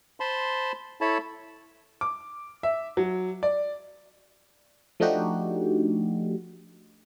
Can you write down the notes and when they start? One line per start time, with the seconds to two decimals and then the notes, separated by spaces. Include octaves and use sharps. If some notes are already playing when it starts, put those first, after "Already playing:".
0.20 C5 A5 B5 C6
1.01 E4 A4 C#5 A5 B5
2.01 D6
2.63 E5
2.97 F#3
3.43 D5
5.00 F3 A3 D4 D#4 F#4 G4